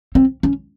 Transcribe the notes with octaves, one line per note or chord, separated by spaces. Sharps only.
C4
C#4